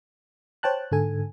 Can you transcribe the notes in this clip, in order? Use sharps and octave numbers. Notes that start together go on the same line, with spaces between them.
C5 C#5 G5 A5 F#6
G#2 D3 A4 G#5